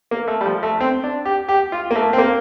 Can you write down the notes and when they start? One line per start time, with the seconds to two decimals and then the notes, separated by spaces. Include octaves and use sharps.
0.11 A#3
0.28 A3
0.41 G3
0.46 F3
0.63 A3
0.80 C4
1.04 D4
1.25 G4
1.49 G4
1.72 F4
1.91 A#3
1.95 A3
2.13 C4
2.18 A#3